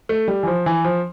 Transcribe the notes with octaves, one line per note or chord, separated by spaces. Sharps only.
A3
G3
E3
F3
E3
F3